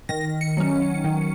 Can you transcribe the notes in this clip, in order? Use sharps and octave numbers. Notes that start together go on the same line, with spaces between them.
D#3 A#6
C#7
F#3 C#4
D#3